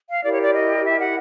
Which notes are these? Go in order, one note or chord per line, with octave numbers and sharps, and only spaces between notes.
F5
E4 G4 A#4 D5
C#5
D5
D#5
E5
F#5